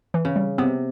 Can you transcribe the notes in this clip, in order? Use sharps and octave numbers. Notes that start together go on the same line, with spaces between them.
E3
C#3
G3
C3 B3